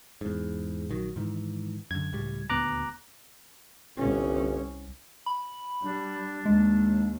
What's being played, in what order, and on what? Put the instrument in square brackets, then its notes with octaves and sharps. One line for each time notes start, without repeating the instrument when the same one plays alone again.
[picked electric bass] E2 G#2
A#1 D#3 F#3
G#2 D#3 E3
[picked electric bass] F#2 D3 [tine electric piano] G#6
[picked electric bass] C#2 A2 G3
[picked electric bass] D#1 D2 B3 [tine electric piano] A#5 D6 F#6
[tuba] G1 [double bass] C2 C#4
[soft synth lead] B5
[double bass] G3 [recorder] D4
[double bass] D#2 [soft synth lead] G#3